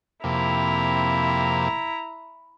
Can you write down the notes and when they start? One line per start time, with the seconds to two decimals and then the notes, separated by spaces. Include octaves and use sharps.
0.24 F2 C3 A#3 E4 A#5